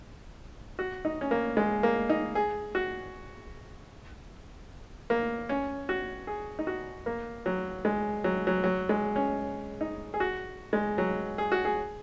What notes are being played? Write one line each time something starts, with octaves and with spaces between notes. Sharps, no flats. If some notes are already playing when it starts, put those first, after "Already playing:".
F#4
D#4
C#4
A#3
G#3
A#3
D#4
G#4
F#4
A#3
C#4
F#4
G#4
D#4
F#4
A#3
F#3
G#3
F#3
F#3
F#3
G#3
C#4
D#4
G#4
F#4
G#3
F#3
G#4
F#4
G#4